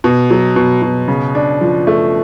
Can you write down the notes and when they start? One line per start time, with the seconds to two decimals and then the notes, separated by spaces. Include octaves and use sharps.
0.04 B2
0.31 F#3
0.56 B2
0.82 B2
1.08 C#3
1.35 D4
1.61 F3
1.87 A3